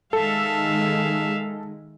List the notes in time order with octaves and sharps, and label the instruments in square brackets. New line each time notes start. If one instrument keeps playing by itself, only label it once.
[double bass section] D#3 G#3 [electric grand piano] A4 [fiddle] E5 F5